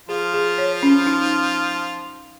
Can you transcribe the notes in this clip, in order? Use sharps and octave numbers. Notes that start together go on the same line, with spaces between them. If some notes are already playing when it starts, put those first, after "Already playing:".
F3 F4 G#4
G#4
C#5
C#4
D#4